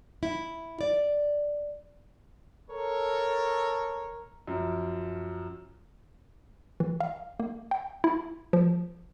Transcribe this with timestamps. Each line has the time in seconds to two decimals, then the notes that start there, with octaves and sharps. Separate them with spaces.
0.23 E4
0.81 D5
2.70 A4 A#4 C#5
4.47 F#2 F3
6.80 E3
7.00 F5
7.40 A#3
7.71 G5
8.04 E4
8.53 F3